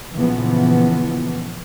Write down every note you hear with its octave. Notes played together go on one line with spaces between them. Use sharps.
A#2 C#3 E3 F3 B3